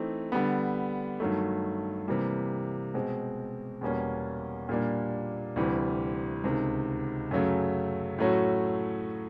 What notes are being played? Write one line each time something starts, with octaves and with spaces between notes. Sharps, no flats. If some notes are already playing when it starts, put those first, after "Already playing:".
Already playing: E3 A3 C4 D#4
D3 G3 B3
G2 D#3 F#3 A3
C3 E3 G3 A#3
B2 G#3 C4
E2 B2 G3 A#3 C#4
A#2 G3 A#3 D4
D2 C3 E3 G3
C#2 C3 D#3
F#2 C#3 F#3 A3
A2 F#3 A3 C#4 F#4